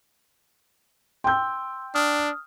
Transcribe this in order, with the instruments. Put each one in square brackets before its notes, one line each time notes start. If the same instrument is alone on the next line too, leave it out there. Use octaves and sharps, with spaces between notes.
[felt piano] G5 G6 [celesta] C6 E6
[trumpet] D4 [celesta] D#6 F6